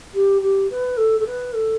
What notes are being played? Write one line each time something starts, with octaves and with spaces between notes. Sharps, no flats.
G4
G4
B4
A4
A4
B4
A4